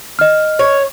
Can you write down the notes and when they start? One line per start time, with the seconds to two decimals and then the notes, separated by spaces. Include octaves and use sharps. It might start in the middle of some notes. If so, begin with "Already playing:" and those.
0.19 D#5 F6
0.59 C#5